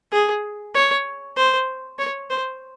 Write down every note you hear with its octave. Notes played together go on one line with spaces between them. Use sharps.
G#4
C#5
C5
C#5
C5